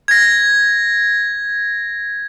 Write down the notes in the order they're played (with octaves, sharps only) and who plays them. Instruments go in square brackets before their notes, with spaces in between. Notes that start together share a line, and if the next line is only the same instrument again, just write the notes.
[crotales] G#6 A#6